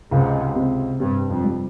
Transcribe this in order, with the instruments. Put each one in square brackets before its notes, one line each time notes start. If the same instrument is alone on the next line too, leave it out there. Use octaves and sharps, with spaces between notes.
[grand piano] C#2 [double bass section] G#2 C3
[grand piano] C3
[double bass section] G2 [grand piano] C3
[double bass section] F2
[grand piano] G3